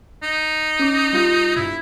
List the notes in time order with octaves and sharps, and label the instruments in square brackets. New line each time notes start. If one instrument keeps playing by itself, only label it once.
[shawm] D#4
[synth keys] C#4 D6
G3 F4
[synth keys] G2 B2 [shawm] E4